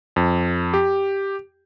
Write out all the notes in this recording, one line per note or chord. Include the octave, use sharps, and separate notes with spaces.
F2
G4